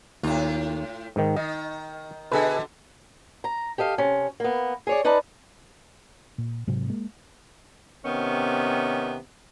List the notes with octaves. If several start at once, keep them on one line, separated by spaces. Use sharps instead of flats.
D#2 A2 F4
G#2 D#3
D#3 D#5
B2 D3 G#4 A4 B4
A#5
G4 A4 D#5 F5
C3 C#4
A#3 B3
G#4 C#5 D5
D#4 B4 D5 A5 A#5
A#2
G#2 C3 F#3 C4
G#3 A#3
C3 D#3 B3 C#4